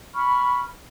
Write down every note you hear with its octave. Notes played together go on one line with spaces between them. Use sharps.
B5 C#6 F6